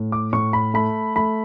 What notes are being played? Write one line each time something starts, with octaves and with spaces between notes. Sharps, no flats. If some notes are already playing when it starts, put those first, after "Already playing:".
Already playing: A2
D6
A2 C#6
B5
A3 B5
A3 B5